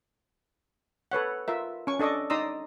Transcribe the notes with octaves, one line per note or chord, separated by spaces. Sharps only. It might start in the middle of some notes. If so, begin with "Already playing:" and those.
A4 B4 C#5 F#5
F4 A#4 E5
C#4 C#6
D4 A4 D#5 C#6 D6
D#4 D5 A#5 C6 D#6 E6